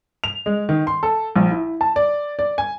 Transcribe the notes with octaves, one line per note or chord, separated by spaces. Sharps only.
F7
G#3
D#3
C6
A4
A#1
E4
A5
D5
D5
G#5